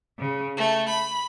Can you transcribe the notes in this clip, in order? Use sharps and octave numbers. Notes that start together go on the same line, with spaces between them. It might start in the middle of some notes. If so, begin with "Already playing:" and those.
C#3
A3
B5